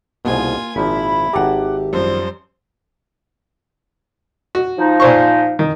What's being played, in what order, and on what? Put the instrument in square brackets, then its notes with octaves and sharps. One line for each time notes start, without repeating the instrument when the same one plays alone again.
[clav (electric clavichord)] C2 G#2 B2 [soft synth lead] A#3 [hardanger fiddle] F4 G#5
[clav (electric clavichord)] G#1 A#2 F3 [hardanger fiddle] E4 [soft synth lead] B5
[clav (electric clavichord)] G#1 A4 A#5 [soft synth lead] G4 [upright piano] F#5 D6
[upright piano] F#2 F3 G3 [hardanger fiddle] C5
[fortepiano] F#4
[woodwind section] F3 D#4
[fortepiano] A#2 C5 C#6
D#3